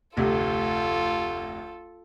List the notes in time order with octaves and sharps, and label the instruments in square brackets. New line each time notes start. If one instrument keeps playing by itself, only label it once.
[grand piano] F1 D2 C3 [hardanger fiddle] F4 A4